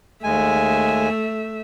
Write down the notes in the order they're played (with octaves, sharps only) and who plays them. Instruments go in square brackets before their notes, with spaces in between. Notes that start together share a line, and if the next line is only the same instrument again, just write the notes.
[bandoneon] D#2 G#3 G#5 [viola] A3 E5